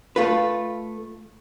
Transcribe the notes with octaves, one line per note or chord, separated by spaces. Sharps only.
A3 F4 B4